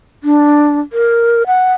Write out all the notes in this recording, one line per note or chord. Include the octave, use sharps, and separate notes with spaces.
D4
A#4
F#5